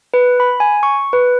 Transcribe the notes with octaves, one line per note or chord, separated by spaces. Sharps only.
B4
B5
G#5
C#6
B4